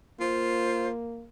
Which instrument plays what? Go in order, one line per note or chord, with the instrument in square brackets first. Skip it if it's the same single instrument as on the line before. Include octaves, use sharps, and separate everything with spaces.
[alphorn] A#3 [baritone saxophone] F4 [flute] C5